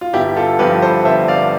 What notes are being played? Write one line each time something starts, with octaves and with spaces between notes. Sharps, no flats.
F4
G1 E4 G4
F4 A4
G2 F3 G4 B4
A4 C5
G1 C5 E5
D5 F5